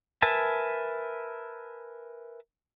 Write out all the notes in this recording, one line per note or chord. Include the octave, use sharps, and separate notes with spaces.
A#4 B4 E5 G#5 A5